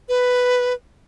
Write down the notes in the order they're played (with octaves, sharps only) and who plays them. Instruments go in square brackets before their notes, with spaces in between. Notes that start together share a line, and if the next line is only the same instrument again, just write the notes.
[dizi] B4